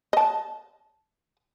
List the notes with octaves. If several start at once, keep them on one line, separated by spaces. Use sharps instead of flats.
D#5 A5